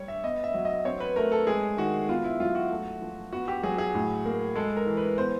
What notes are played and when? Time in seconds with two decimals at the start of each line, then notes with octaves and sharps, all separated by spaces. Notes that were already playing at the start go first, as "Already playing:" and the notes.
Already playing: G3 C#5
0.08 E5
0.23 B3 D#5
0.44 E5
0.54 F#3
0.65 D#5
0.85 C4 C#5
1.00 B4
1.16 A3 A#4
1.32 A4
1.47 G#3 G#4
1.77 D#3 F#4
2.08 B3 F4
2.24 E4
2.40 F#3 F4
2.55 F#4
2.71 A3
3.02 F3
3.32 B3 F#4
3.48 G4
3.63 F#3 G#4
3.78 G#4
3.95 A2
4.25 A#3
4.55 G#3 A4
4.77 A#4
4.87 E3
4.97 B4
5.18 B3 C5